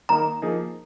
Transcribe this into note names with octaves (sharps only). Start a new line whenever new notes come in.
D#3 A#3 D#4 A#4 A#5
F3 A#3 D#4 G#4